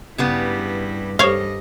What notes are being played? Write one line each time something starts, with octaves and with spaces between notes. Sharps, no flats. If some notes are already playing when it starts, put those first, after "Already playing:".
G2 C#3 G3 B3 E4
G2 G4 A4 C5 C#5 D#5 F5